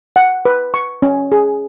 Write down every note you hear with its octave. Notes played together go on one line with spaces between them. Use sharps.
F#5
B4
C#6
C#4
G#4